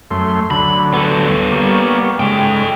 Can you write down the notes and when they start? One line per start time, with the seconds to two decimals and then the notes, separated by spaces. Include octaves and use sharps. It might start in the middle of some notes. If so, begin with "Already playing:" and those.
0.11 F#2 A3 C6
0.51 D2 D3 F#3 B5
0.94 B3 A4
1.52 G3 A#3 C#6
2.20 G#2 C#3 G#3 A4 G5